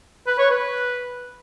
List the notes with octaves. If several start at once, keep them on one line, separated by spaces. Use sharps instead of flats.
B4
C#5
B4